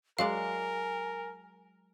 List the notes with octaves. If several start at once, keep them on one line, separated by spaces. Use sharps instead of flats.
F#3 G#3 A#4 D5 F5 G#5